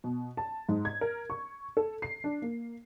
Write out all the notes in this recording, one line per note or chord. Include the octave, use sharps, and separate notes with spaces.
B2
A5
G#2
G#6
A#4
C#6
A4
C7
D4
A#3